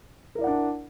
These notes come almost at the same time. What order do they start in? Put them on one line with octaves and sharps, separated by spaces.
A#4 E4 D5 F#5 D4